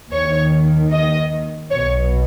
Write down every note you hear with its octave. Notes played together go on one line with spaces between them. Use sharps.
D#2 D#3 C#5
D#5
B1 B2 C#5